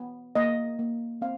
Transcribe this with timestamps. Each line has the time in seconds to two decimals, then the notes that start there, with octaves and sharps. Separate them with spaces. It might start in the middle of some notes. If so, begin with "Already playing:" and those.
Already playing: B3
0.35 A#3 D#5
0.79 A#3
1.22 C4 F5